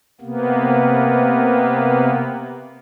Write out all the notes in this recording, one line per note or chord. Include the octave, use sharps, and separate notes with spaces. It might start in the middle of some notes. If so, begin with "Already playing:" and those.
C3 A#3 B3